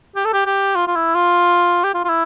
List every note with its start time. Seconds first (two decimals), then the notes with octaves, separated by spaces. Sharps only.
0.16 G4
0.25 A4
0.34 G4
0.46 G4
0.76 F4
0.87 F4
0.95 E4
1.15 F4
1.84 G4
1.94 F4
2.05 F4
2.09 E4